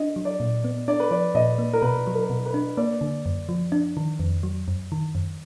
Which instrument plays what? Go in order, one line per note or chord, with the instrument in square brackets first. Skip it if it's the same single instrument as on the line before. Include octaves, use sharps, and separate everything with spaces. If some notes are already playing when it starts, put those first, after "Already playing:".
Already playing: [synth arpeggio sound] D4 [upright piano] D#5
[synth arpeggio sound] F#3
[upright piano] D5
[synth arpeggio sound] A#2
B3
[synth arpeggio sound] D4 [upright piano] D5
[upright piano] B4
[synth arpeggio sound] F3 [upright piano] D5
[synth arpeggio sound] A#2 [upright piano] D#5
[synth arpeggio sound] A#3
[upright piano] A#4
[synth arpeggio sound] B2 [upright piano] B4
[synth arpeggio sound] F#3
[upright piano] A#4
[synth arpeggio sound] B2
[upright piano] B4
[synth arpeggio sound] D4
[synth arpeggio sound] A#3 [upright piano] D5
[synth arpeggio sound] D3
F#2
F3
D4
D#3
F2
F#3
F#2
D#3
F#2